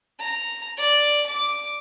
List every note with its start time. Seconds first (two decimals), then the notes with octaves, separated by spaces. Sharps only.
0.19 A#5
0.77 D5
1.27 D6